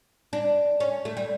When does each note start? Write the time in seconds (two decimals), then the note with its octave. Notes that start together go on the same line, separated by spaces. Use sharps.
0.33 D4
0.80 C#4
1.05 A3
1.17 G3